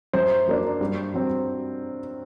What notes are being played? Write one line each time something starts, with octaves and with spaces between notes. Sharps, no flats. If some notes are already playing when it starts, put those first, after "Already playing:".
F#2 C5
F#3 A#3 D4
G2
F#3 C4